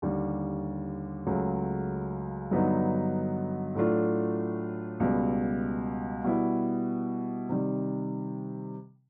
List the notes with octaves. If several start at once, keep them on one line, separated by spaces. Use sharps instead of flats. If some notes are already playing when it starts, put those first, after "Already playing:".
D#2 D3 G3
C#2 C#3 F#3 A3
G2 D3 F#3 B3 D#4
A2 F#3 A3 D4 F4
C#2 B2 G3 B3
B2 G3 B3 E4
C3 D#3 G3